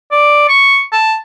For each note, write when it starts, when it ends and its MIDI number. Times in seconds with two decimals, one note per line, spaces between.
0.12 0.45 74
0.49 0.81 85
0.92 1.16 81